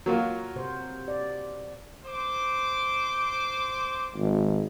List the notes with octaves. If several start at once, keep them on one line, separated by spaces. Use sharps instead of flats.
F#3 A#3 F4 F#4 A#4
C3 C5
D5
C5 D6
G#1